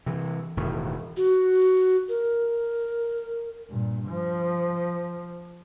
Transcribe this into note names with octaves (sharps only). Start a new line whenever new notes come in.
C3 E3
E1 A2 D#3
F#4
A#4
G2 A#2
F3